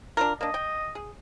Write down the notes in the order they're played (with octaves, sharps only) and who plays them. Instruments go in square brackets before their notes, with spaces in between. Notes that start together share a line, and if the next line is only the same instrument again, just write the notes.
[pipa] D4 F4 A#4
[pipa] A#3 D4 [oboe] D#5
[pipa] G5
G#4